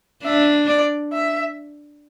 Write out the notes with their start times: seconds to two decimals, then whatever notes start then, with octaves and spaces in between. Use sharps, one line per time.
0.24 D4 E5
0.68 D5
1.13 E5